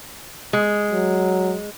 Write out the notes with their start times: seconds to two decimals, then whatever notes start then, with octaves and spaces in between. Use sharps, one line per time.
0.53 G#3
0.91 F#3